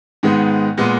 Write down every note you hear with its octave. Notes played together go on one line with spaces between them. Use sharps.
G#2 D#3 G#3 B3
A#2 G#3 B3